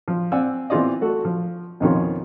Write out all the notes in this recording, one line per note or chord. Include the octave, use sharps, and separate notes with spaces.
F3
C4 D5 F5 F#5 G#5 E6
E3 B3 C4 F4 D5 D#5
A3 F#4 A4
F3
F2 B2 D#3 F3 C#4 F4